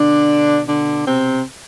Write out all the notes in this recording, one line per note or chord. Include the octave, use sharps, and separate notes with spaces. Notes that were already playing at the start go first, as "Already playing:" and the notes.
Already playing: B2 D3 D4
D3 D4
C3 C4